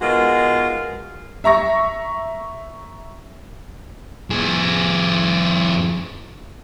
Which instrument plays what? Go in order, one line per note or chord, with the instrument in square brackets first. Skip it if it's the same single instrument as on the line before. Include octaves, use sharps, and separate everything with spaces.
[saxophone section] B2 G#3 D#4 F4 F#4 A#4
[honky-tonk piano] E5 A#5 C#6 A#6
[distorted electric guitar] F2 G#4